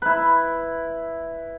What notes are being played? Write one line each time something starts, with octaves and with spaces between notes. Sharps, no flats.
E4 B4